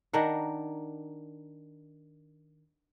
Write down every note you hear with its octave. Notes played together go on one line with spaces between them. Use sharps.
D#3 D4 A#4 F#5